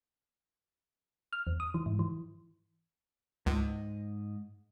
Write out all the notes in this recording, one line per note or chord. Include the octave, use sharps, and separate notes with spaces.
F6
E2
D#6
E3
G#2
E3
C#2 G#2 D#5